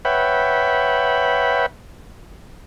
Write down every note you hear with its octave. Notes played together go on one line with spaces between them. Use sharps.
B4 C#5 E5 F#5 G5 B5